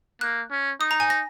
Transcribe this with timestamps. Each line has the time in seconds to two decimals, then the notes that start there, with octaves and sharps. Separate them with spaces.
0.21 A#3 F#6
0.51 C#4
0.80 D#4 D#6
0.91 A#5
1.00 G#5
1.10 A#6